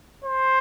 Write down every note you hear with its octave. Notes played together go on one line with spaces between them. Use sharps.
C5